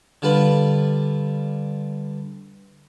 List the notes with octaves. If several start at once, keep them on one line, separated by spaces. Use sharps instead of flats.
D3 G3 F4 B4